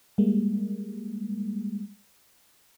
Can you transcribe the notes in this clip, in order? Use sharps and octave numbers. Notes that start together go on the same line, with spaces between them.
G3 G#3 A#3